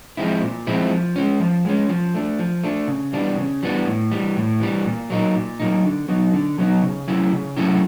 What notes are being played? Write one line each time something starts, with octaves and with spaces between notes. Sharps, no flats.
F3 G#3 C4 E4
A#2
F3 G#3 C4 E4
F3
G#3 C#4
F3
G#3 C#4
F3
A3 D4
F3
A3 D4
C#3
E3 G3 B3 D4
C#3
E3 G3 B3 D4
A2
E3 G3
A2
E3 G3
A#2
F#3 A#3 D#4
A#2
F#3 A#3 D#4
D3
F#3 B3 D#4
D3
F#3 B3 D#4
C#3
F#3 A3 C#4 E4
C#3
F#3 A3 C#4 E4